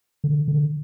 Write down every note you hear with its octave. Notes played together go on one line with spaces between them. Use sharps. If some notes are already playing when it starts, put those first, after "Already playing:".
D3
D3